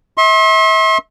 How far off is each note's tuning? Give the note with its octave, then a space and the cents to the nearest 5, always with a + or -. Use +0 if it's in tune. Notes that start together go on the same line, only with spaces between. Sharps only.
E5 -35 C6 +40